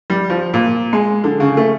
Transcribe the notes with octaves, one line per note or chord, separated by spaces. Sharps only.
G3
F3
A#2
G#3
D3
C#3
A3